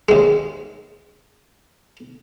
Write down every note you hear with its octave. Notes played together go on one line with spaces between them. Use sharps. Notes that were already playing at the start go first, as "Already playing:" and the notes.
D#2 G#3